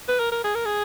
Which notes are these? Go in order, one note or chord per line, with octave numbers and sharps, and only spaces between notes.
B4
A#4
A#4
G#4
A#4
G#4